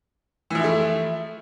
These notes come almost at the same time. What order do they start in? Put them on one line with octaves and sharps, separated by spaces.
E3 F3 E4 A3